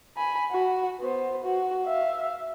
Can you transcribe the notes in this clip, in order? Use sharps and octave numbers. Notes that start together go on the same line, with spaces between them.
G#5 B5
F#4
B3 C5
F#4
E5 F5